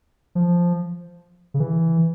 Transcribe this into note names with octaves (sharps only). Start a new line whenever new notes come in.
F3
C#3
E3